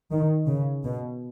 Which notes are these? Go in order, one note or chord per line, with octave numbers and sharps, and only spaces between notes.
D#3
C#3
B2